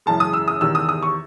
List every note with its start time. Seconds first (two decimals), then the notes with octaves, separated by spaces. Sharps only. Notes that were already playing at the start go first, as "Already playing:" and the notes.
0.06 F#2 C#3 E3 G#3 A5
0.20 D#6
0.33 E6
0.48 D#6
0.61 E2 C3 D#3 G#3 E6
0.75 D#6
0.89 D#6
1.03 C#6